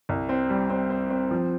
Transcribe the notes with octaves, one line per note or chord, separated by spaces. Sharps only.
C2
C4
G3
C4
C4
C4
F3